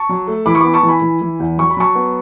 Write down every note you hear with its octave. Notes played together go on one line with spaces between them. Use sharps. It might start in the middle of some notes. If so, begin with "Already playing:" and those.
Already playing: A5 C#6
F#3
A3
E3 B5 D6
C#6
B3 B5 D6
A5 C#6
E3
G#5 B5
E3
E3
E2
F#3 C#6
B5
F#3 A5 C#6
B3